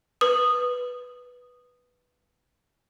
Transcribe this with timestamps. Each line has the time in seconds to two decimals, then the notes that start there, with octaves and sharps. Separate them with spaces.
0.21 B4 D#6